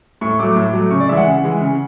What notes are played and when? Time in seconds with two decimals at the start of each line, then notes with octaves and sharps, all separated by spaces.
0.21 A2 C#6
0.39 F#3 A3 D6
0.56 A2
0.73 F#3 A3
0.91 C#3 C#6
1.00 D5
1.09 E3 G#3 E5
1.17 F#5
1.26 C#3
1.43 E3 G#3
1.61 C#3